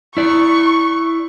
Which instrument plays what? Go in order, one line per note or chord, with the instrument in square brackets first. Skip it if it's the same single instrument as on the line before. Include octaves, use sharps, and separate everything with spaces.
[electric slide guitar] E4 D5 [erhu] C#6